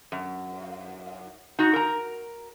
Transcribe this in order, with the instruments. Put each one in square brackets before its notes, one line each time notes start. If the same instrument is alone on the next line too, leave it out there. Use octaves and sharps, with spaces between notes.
[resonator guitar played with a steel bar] F#2
D#4 F#4
A#4 A#5